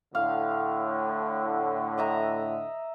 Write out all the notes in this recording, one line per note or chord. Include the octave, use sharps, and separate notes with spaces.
A2 D3 F5
D#5 E5 A#5